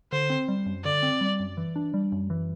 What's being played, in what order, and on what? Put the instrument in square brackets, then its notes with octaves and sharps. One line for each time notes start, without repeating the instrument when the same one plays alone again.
[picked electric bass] D3 [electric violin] C5
[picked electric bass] C4
G3
F#2
[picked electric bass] D3 [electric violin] D5
[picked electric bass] C4
G3
F#2
E3
D4
G3
F#2
E3